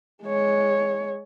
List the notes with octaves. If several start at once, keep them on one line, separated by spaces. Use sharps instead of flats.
G#3 C#5